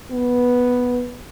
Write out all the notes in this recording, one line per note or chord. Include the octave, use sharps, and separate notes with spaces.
B3